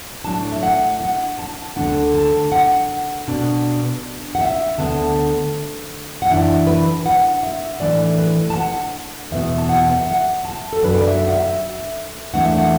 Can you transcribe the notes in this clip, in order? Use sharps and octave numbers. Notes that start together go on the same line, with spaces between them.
A2 F#3 D4 A5
E5
F#5
F#5
A5
D2 D3 A3 D4 F#5
A5
F#5
B2 B3 D4
F#5
E5
D2 D3 B3 D4 A5
F#5
F#2 E3 D4 E5
B4
F#5
E5
A2 E3 D4 D5
B4
A5
F#5
E2 B2 B3 E5
A5
F#5
E5
F#5
A5
A4
F#2 F#3 D4 B4
D5
E5
F#5
E5
E2 E3 A3 D4 F#5
E5
F#5